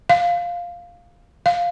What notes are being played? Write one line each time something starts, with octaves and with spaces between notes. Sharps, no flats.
F5
F5